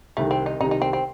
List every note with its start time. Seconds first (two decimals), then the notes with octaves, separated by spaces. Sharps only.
0.17 C2 C3 D#3 A3
0.31 C4
0.46 D#4
0.60 C2 C3 D#3 D#4
0.71 D#4
0.82 C4
0.93 C4